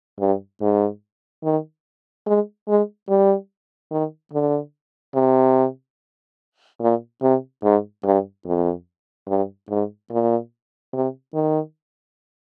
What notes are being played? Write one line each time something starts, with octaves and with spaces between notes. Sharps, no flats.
G2
G#2
D#3
G#3
G#3
G3
D#3
D3
C3
A#2
C3
G#2
G2
F2
G2
G#2
A#2
C3
D#3